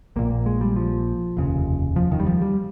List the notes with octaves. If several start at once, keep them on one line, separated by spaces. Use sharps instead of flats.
A#1 A#2 A#3
G#3
G3
F3
F1 D#2 C#3
F3
D#3
G3
F3
G3